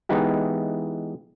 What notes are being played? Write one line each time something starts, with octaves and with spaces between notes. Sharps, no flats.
E3 G#3 B3 D#4 E4 G4